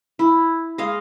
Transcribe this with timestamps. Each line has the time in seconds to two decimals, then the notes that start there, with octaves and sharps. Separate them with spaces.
0.19 E4
0.78 G#3 D#5 F5